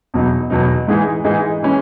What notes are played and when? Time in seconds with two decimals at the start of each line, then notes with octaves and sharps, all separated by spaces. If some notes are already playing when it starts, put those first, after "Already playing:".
0.14 E2 B2 F#3 B3 D#4
0.50 E2 B2 F#3 B3 D#4
0.88 G#2 E3 G#3 D#4 G#4
1.24 G#2 E3 G#3 D#4 G#4
1.63 E3 G#3 C#4